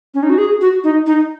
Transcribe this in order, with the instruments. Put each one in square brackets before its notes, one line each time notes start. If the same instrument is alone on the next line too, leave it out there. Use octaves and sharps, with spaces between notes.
[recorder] C#4
D#4
F#4
G#4
F#4
D#4
D#4